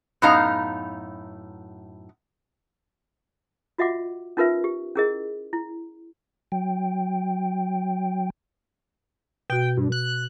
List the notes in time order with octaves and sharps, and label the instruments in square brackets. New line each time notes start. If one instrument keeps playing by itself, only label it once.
[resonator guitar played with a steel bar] F#2 A2 B3 D#4 F5 A#5
[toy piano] F4 F#4 D#5 E5 F#5 D6
C#4 D#4 F4 A#4 B4 E5
G4
C#4 E4 G#4 A#4 D#5
E4
[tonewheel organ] F#3 G5
[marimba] B2 F#4 [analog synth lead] G5
[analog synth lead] G2
F#6